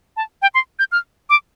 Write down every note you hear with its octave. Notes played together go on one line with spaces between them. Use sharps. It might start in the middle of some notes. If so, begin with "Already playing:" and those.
A5
G5
C6
G6
F6
D6